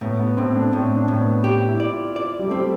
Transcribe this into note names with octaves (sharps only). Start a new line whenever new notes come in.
A2 B3
B3
A2 C4
D4
A2 C4
D4
A2
B3
G4
E4
D5
F4
D5
G3
A3
G3 C4